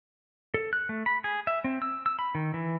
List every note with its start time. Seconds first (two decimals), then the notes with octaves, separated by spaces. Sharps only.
0.54 A4
0.73 F#6
0.89 A3
1.06 B5
1.24 G#4
1.47 E5
1.64 C4
1.82 E6
2.06 E6
2.19 B5
2.35 D#3
2.54 E3